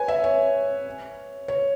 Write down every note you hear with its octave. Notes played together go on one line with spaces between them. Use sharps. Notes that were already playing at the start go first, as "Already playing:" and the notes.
Already playing: B4 C#5 G#5
E5
C#5
C#5